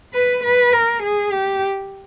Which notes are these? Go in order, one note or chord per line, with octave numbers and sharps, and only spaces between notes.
B4
B4
A#4
G#4
G4